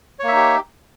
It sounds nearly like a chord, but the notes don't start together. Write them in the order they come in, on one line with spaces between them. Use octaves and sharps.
C#5 A#3 E5 D#4 G4